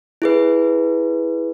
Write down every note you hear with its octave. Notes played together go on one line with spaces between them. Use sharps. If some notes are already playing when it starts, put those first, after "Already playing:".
E4 G#4 B4